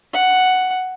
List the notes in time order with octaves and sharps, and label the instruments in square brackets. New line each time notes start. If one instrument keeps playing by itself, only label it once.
[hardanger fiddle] F#5